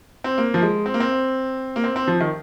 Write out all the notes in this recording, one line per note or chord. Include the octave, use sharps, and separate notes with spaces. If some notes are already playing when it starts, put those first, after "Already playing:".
C4
A#3
F3
G#3
C4
A#3
C4
A#3
C4
C4
F3
D#3